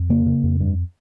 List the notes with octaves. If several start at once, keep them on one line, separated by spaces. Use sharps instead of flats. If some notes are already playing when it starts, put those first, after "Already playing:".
Already playing: F2
C#3 A#3
C#3
F2
G2